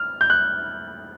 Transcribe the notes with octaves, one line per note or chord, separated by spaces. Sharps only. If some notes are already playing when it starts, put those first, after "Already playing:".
Already playing: F6
G6
F#6